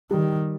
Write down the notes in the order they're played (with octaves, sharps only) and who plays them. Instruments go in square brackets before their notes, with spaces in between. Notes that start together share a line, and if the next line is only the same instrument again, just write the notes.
[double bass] D#3 [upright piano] G3